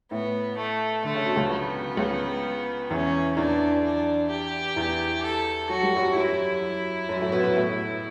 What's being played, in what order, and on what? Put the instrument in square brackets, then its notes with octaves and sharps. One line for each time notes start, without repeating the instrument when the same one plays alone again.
[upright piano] A2 [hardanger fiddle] B3
[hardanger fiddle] A3
[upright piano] D3 [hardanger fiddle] A3
[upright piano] C#3
B2
C#2 C#3
[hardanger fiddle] B3
[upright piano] C#2 C#3
[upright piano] E2 E3 [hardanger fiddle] C#4
[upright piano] E2 E3 [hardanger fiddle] D4
[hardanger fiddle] D4
G4
[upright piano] E2 E3
[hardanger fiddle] A4
[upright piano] F#3 [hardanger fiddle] F#4
[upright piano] G3
F#2 F#3
[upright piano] F#2 F#3 [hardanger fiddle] E4
[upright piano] F#2 F#3
A2 A3
B2 B3
B2 B3
A2 A3